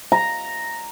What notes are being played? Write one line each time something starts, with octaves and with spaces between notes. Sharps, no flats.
A#5